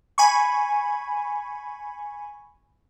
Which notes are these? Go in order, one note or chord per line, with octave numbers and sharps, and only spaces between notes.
G#5 B5 C#6